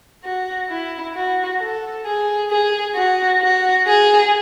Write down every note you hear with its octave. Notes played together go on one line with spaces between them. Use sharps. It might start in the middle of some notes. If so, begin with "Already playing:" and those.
F#4
E4
F#4
A4
G#4
G#4
F#4
F#4
G#4